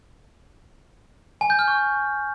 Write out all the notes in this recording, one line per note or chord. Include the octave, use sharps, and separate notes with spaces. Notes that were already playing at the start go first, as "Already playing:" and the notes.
G#5
G6
F6
C#6